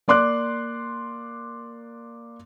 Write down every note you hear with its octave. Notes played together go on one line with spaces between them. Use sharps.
A#3 D5 C6 D6 F#6